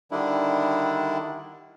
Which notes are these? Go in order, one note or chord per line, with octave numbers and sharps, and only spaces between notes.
D3 D#3 G3 D4 E4